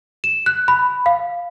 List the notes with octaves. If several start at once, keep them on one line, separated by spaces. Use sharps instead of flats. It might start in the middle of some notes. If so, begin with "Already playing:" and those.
E7
F#6
B5
F5